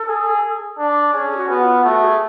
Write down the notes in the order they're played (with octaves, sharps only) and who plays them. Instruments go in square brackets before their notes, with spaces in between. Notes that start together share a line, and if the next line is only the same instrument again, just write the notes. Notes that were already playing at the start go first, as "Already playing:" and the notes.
Already playing: [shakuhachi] A4
[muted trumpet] G#4
D4
[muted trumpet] C#4 [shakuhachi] G#4
[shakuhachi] G#4
F#4
[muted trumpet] B3
[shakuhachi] F4
[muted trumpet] A3 [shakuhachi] F#4
[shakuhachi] G#4